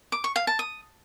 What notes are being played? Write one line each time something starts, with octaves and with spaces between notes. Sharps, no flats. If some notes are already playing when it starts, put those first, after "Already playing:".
D6
C#6
F5
A5
D#6